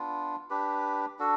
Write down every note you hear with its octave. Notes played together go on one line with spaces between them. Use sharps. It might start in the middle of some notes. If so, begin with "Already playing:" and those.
Already playing: B3 D4 F4
D4 G4 B4
D4 F#4 A4